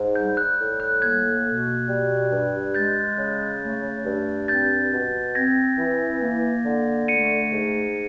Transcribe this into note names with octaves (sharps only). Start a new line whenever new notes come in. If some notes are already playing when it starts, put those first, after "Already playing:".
Already playing: G#2
G3 G6
F#6
A2
F#6
A#3 F#6 G#6
B2
G3
G2
G#3 G6 A6
C#3
A3
G2
C4 G6 A6
B2
C4 G#6 A#6
E3
A#3
D3
A3 C#7 D#7
G#2